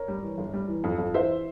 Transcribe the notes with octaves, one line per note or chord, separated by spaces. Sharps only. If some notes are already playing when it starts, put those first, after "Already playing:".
Already playing: A#4 C#5
G3
E3
G1
G3
E3
F2
F2
E3 C5 E5